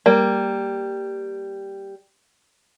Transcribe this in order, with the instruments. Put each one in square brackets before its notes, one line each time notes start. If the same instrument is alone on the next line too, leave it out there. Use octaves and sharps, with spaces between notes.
[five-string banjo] G3 A#3